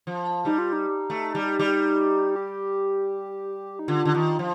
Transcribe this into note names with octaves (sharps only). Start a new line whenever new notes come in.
F3
G3 D#4
F4
D#4
A3
G3
G3
G4
D#4
D3 F4
D3
D#3
F3